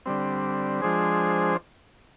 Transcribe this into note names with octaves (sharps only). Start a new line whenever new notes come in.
D3 G3 C4
F3 G#3 D4 G#4 C5